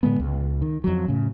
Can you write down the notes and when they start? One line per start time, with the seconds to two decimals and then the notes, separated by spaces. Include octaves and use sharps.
0.03 A2 D3 G#3 B3
0.20 C#2
0.62 D#3
0.84 F2 F#3
1.08 A2 C#3